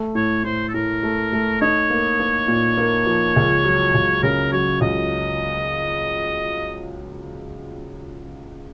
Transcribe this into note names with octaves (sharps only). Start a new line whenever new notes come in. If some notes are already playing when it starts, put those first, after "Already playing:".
Already playing: A3
A2 C#5
A2 C5
A4
A2 A#4
A3
A3
D#4 C#5
A#3
A#3
A#2
A#3
F3
C#2
F#3
C#2
C#3 A#4
F#3 C#5
C#2 D#5